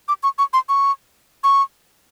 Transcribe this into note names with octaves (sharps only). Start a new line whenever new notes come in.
D6
C#6
C#6
C6
C#6
C#6